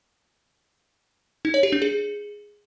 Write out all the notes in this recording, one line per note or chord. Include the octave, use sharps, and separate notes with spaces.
D#4
C#5
G4
D4
G#4